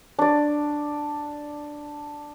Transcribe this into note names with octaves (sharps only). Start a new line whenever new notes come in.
D4 D5